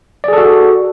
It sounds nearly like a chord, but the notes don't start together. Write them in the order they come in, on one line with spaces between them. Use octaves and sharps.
D5 G#4 A4 F#4